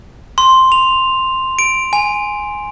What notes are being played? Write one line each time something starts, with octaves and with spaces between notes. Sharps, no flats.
C6
F7
D7
G#5